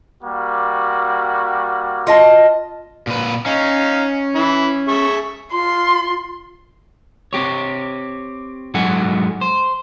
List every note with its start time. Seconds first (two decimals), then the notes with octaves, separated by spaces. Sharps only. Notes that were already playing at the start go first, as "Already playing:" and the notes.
0.22 G3 A#3 F#4
2.07 F4 D#5 A5
3.07 A#2 B4
3.46 C#4 D#4 F5
4.35 E3 E4
4.88 G#4 E5 C#6
5.52 F4 C6
7.33 C4 G4 C#5
8.74 G#2 F#3 A4 F#5 G#5
9.41 C5